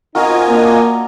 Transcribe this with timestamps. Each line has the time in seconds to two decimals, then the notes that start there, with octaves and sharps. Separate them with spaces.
0.15 C4 D#4 F4 F#4 A#4 D#5 G#5
0.49 A#3 D4 A#5